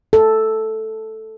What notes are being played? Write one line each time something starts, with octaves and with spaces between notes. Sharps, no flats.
A4